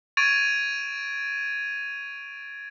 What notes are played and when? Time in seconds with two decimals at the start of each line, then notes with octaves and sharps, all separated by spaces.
0.17 C#6 G#6 A6 D7 D#7 F7